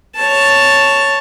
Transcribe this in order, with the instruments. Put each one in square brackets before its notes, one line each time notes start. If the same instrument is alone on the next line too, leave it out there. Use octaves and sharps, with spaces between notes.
[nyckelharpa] C#5 A5